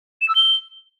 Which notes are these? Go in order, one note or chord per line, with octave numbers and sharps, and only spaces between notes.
E7
E6
G7